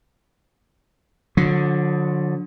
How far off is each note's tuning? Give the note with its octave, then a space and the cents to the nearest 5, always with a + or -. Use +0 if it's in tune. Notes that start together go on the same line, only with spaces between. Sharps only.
D3 +0 F#3 -45